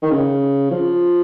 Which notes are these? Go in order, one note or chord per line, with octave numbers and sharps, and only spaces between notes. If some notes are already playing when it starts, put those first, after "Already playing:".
D#3
C#3
F3